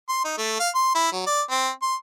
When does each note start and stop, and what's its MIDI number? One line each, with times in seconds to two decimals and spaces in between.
0.09 0.20 84
0.24 0.36 63
0.38 0.57 57
0.60 0.69 77
0.75 0.92 84
0.95 1.09 64
1.12 1.24 54
1.27 1.41 74
1.50 1.70 60
1.82 1.95 84